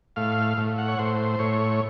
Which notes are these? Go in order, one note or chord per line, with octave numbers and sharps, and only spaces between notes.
A2 F5
A2
F#5
C#5
A2 C5
A2 C#5